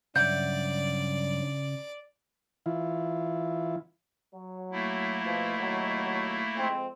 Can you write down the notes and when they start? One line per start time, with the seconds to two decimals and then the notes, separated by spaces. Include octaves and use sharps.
0.16 G2 C#3 F#3 G3 D5 E5 F#5 G6
2.66 E3 E4 F4
4.33 F#3
4.72 A3 A#3 E4
5.23 B2 F3
5.59 D#2 F#3
6.55 F2 G#3 C4